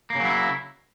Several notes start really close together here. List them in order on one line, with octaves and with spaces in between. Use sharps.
A#3 C#3 F#3 E4